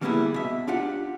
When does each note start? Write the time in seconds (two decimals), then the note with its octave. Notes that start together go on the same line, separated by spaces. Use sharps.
0.01 D3 G3 A#3 B3 E4 G#4
0.34 B2 E5
0.67 D4 F4 G4 F#5